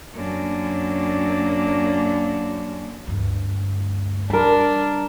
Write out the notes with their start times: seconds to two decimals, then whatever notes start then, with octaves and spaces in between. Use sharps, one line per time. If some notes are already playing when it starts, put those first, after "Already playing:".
0.14 F#2 A#3 D4
3.07 D2 G2
4.30 G3 D4 A#4 B5